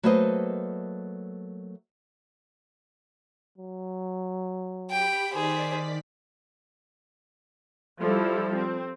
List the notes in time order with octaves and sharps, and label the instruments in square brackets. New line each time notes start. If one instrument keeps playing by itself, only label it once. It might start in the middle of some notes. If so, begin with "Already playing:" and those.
[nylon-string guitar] F#3 A3 A#3 B4 C5 D#5
[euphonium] F#3
[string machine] G4 B5 [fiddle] G5
[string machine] D#3 D5 B6 [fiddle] G#4 C5
[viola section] F3 G3 E4 A4
C4